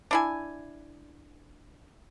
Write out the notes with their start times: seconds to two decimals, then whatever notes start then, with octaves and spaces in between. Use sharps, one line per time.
0.11 D4 E4 G#5